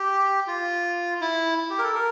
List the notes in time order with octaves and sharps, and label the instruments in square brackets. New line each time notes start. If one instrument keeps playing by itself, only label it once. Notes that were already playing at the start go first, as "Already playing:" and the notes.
Already playing: [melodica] G4
F4
E4
G4
A#4
A4
A#4